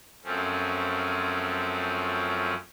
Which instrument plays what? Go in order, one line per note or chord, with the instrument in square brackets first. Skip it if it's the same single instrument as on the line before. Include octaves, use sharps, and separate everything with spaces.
[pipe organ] F#2 F3 A3 C4 C#4